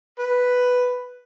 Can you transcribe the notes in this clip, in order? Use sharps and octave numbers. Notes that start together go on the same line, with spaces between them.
B4